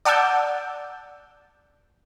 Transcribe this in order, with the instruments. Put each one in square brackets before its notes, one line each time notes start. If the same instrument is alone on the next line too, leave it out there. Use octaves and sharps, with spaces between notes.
[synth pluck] D5 F#5 A5 D6 E6 G6